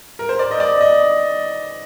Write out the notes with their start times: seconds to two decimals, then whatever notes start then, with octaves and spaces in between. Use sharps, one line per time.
0.19 A#4
0.29 C5
0.39 D5
0.51 D#5
0.60 D5
0.81 D#5